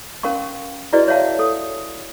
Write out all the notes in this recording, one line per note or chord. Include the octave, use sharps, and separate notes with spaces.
C#4 A#4 F5 C6 C#6
E4 F#4 G#4 B4 D5 D#5
C#5 E5 F5 A5
A4 D#6